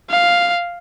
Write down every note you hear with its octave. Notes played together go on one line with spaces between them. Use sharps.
F5